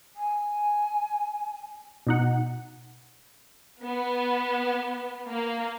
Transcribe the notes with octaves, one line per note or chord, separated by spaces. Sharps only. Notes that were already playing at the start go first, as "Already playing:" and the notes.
G#5
B2 D#4 F#5
B3
A#3